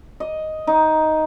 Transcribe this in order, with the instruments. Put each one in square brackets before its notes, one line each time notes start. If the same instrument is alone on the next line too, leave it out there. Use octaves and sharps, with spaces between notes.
[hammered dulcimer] D#5
D#4